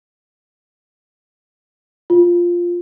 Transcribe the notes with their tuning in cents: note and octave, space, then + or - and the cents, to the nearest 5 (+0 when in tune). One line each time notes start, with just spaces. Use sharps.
F4 +0